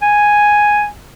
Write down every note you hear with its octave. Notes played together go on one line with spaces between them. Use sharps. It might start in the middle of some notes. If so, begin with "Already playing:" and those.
G#5